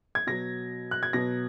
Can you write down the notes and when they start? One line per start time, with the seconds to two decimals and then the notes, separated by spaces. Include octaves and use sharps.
0.15 G#6
0.27 B2 F#3 A#6
0.91 F#6
1.03 G#6
1.13 B2 F#3 A#6